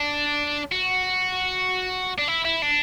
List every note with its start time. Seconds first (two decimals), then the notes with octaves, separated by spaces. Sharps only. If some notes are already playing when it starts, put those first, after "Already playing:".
Already playing: D4
0.72 F#4
2.18 D4
2.28 E4
2.45 E4
2.62 D4